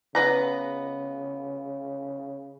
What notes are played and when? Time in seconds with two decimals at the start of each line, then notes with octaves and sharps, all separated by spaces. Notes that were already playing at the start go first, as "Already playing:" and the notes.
0.15 C#3 B3 B4 A#5